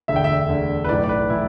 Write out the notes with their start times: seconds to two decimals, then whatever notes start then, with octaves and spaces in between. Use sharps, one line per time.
0.08 E1 D2 D3 E5
0.16 G5
0.24 E5
0.49 E1 D2 D3
0.84 B4
0.89 B1 A2 E3 D5
1.04 D5
1.09 B4
1.29 A2 E3 E4